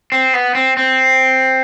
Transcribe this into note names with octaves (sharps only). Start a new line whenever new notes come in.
C4
B3
C4
C4